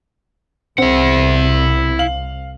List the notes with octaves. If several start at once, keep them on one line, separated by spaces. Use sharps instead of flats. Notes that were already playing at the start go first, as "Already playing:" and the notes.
C2 C3 C4 E4 F#5
F5 F#7